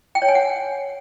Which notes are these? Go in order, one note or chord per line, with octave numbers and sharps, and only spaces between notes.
G5
C#5
G#5
F#5